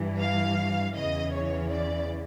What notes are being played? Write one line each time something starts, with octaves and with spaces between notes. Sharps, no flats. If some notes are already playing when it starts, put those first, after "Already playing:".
Already playing: G2 E3
F5
E2 C#3 E3 D#5
C#5
D5